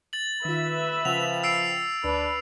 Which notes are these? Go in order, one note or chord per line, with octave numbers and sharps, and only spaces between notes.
A6 F#7
D#3 F4 B4 E5
C#3 F3 F#5 G5 F7
E6 C7 D7
D2 D4 B4